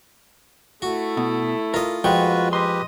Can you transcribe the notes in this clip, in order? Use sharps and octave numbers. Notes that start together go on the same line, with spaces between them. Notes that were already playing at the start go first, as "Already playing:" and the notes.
A3 E4 F#4
B2
F4 A#4 D#5
F2 G#3 F4 F#4 B4 G5 C#6
G4 B4 D#5 C6